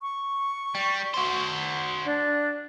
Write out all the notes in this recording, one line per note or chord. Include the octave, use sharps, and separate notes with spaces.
C#6
G3
F#4 C5
D4